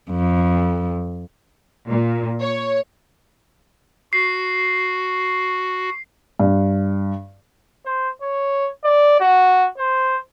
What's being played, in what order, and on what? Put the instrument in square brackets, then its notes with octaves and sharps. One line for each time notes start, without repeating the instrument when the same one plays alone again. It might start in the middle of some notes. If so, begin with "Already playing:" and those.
[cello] F2
[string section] A#2
C#5
[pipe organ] F#4 [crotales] C7
[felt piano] G2
[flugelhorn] C5
C#5
D5
F#4
C5